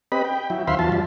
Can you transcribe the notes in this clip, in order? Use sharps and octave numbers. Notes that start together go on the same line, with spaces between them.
C4 G4 B4 D#5 B5
G5
F#3 E4
D#2 C5 E5 F5 B5 C6
E2 F#3 F4 A5
F#2 F3 G3